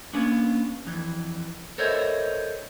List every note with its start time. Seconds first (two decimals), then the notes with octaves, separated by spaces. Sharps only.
0.13 A#3 B3 C#4 D4
0.87 F2 E3
1.78 A4 A#4 C5 C#5 D#5 E5